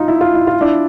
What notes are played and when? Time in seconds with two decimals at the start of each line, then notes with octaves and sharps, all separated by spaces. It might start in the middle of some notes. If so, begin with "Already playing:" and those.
Already playing: D#4 F4
0.08 E4
0.21 F4
0.34 E4
0.47 F4
0.61 D4 E4